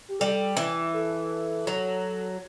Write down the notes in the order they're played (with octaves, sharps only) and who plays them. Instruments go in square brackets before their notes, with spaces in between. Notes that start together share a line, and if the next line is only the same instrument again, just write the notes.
[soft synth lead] G4
[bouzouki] G3 [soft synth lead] A4
[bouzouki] E3
[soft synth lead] A4
[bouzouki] F#3